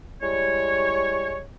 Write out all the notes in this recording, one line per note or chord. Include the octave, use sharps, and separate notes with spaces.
G3 G#3 E4 C#5